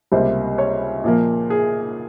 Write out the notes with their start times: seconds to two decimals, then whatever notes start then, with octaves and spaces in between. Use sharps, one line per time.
0.12 C#2 C3 G3 A#3 C5
0.58 C#5
1.04 A#2 F3 A#3
1.50 G#4